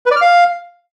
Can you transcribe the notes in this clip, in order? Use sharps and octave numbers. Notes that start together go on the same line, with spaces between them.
B4
D5
F6
F5